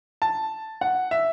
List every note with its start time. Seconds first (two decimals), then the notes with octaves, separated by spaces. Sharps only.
0.22 A5
0.81 F#5
1.11 E5